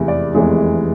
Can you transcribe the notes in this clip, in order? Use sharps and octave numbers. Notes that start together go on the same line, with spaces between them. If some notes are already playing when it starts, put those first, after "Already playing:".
Already playing: F1 E2 C3 E3 G#3
D5
F1 E2 C3 E3 G#3